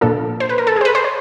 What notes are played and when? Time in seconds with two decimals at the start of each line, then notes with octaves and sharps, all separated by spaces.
0.01 A#2 F3 A#3 D4 F4 A4
0.40 C5
0.49 B4
0.58 A#4
0.67 A4
0.76 G#4
0.81 C5
0.85 B4
0.95 C5
1.04 C#5